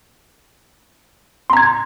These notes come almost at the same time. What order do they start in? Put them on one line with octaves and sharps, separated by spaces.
C6 A#5 G#6